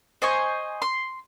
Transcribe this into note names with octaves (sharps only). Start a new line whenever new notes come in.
C5 D#5 G#5 C#6
C6